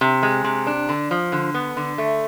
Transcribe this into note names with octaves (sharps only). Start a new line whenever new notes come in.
C3
G#3
C3
D4
D3
F3
D3
B3
D3
A3